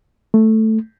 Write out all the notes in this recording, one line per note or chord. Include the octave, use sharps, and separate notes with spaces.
A3